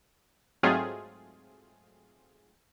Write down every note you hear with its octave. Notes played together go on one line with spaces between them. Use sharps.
G#2 F#3 A3 C4 F4 G#4